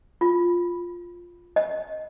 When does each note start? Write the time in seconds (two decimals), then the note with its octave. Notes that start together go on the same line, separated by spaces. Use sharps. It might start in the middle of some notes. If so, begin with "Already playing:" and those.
0.21 F4
1.56 D#5